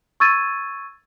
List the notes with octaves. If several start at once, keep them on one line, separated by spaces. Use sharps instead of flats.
C#6 E6 G#6 A6 D#7